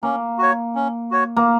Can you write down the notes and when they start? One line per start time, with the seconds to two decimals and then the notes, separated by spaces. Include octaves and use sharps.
0.03 A#3 C#4
0.38 F#4 C#5
0.75 C#4
1.11 F#4 C#5
1.36 A#3